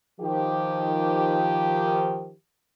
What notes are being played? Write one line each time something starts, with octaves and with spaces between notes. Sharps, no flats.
D#3 F3 G4